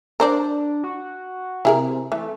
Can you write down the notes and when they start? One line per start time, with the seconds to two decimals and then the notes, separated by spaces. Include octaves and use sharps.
0.20 D4 A#4 C5 D5
0.84 F#4
1.65 C3 E4 G#4 A#4
2.12 E3 A3